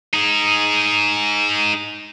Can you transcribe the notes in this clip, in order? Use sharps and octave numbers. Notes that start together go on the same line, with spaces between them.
D#4 G#4